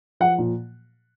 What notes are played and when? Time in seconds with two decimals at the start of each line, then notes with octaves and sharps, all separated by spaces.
0.20 F3 F#5
0.38 A#2